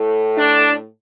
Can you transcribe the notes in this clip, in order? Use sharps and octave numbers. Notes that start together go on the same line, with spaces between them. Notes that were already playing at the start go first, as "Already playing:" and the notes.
Already playing: A2 A3
D4